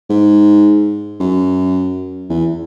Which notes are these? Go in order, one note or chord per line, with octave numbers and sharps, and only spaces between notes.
G#2
F#2
E2